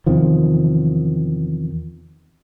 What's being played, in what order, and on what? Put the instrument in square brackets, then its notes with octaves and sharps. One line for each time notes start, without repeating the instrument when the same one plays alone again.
[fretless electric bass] E2 C3 D#3 F3